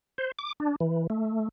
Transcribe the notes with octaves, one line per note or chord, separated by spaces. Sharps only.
C5
D6
D4
E3
A3